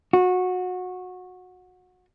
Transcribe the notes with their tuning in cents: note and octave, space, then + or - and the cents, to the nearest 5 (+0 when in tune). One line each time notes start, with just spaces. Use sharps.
F#4 -20